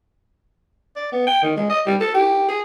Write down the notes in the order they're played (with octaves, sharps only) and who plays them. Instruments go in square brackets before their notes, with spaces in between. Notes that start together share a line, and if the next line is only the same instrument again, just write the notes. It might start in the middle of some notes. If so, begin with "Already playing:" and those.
[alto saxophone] D5
B3
G5
D#3
G#3
D#5
G3
A4
G4
G#4